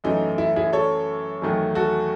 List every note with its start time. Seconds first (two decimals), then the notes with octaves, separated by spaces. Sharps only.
0.04 F#2 E3 A3 D#4
0.38 E4
0.56 E4 G#4
0.73 A4 C#5
1.42 E2 D#3 F#3 A3
1.75 F#4 A4